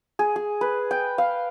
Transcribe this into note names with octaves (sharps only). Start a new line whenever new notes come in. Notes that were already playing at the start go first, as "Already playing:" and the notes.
G#4
G#4
B4
G5
F5